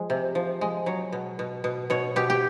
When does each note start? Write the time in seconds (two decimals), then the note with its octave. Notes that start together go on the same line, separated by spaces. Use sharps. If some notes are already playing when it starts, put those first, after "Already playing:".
Already playing: F3 G#3
0.10 C3
0.35 F3
0.61 G#3
0.86 F#3 C#5
1.12 B2
1.39 B2
1.64 B2
1.90 B2 C#5
2.16 B2 G4
2.30 G4